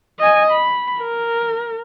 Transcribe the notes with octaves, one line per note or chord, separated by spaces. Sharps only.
D#5 G#5
B5
A#4